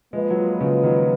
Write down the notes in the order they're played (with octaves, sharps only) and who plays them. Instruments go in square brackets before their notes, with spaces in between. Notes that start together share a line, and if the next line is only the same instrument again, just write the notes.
[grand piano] F3 G#3 [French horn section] A#3 F4 B4 D#5
[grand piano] F#3
F3 G#3
C#3 F3
F3
D#3 F#3